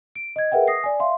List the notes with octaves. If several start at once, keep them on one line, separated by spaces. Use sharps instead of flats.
D7
D#5 G#6
G#4 A#4 B4 E5 F#5 G5
D#6 A#6 C7
D5 G#5
E5 F5 C6